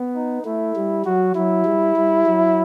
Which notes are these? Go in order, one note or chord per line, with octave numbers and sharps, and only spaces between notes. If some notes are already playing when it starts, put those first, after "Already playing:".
Already playing: B3
D#4
A3 E4
G3
F#3 F#4
F#3 E4
G3
G3
F#3